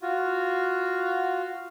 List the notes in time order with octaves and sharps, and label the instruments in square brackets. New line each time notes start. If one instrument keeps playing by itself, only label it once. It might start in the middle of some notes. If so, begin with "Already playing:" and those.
[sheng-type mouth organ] F4 F#4